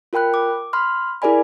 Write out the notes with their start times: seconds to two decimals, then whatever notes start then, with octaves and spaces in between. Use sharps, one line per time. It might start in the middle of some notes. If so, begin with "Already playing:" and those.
0.13 F4 A#4 G5 B5 F#6
0.34 D6
0.73 B5 C6 F6
1.22 E4 G#4 A#4 D5 G#5 B5